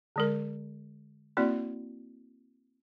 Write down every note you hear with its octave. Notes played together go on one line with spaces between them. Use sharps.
D3 G#3 A#4
A#3 C4 E4 F#4 D5